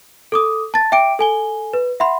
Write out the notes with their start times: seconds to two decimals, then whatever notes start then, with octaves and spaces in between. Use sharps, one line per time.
0.32 A4 D6 D#6
0.74 A5 A6
0.92 E5 G5 D6 D7
1.19 A4 G#5 G7
1.73 B4
2.00 E5 F#5 B5 C6